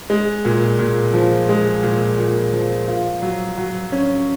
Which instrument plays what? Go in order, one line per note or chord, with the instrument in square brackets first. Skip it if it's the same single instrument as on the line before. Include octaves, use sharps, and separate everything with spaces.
[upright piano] G#3
A#2
A#2
F3
G#3
A#2
A#2
F3
F4
F#3
F#3
C#4